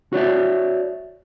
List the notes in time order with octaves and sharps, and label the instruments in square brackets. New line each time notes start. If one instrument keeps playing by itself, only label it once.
[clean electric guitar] F#4 C#5 D5 E5